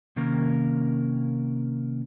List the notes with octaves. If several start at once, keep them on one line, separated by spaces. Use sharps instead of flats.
C3 D#3 A#3 C#4 A#4